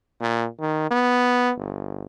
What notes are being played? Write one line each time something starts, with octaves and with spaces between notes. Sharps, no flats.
A#2
D#3
B3
G1